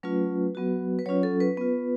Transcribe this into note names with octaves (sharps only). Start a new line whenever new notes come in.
F#3 A3 C#4 F4 B4
F#3 B3 F#4
B4
F#3 C#4 F4 C#5
A4
B4
B3 F4